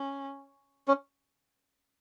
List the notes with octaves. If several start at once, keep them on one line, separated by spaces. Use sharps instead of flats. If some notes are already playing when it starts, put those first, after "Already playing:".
Already playing: C#4
C#4